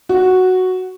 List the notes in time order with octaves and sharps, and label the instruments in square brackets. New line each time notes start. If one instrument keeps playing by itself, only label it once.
[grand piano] F#4